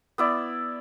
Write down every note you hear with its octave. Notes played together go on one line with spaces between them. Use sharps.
B3 E4 D5